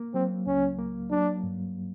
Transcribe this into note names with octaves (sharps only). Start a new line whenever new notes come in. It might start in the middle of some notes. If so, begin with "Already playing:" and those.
Already playing: A#3
F#3 C4
C#2 C#4
A#3
F#3 D4
G2